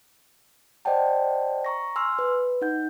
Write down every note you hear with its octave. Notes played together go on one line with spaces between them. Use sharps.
C5 D5 D#5 F#5 G5 A5
A#5 C#6 A#6
G#5 C6 E6 F6
B4
D#4 F#5 G6